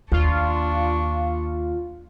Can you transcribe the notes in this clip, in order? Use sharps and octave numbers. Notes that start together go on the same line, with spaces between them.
D#2 D4 F4 C#6